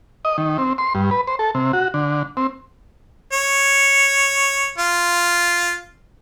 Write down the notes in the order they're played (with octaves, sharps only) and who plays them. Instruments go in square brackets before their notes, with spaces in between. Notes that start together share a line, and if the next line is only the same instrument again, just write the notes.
[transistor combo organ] D#5
D#3
C4
C6
G2
B4
C5
A4
C3
F#4
D3
C4
[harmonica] C#5
F4